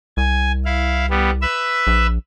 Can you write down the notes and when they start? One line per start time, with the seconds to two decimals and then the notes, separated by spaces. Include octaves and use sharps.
0.17 C2 G#5
0.65 E4 F5
1.10 G3 B3
1.42 B4 E5 E6
1.87 A#1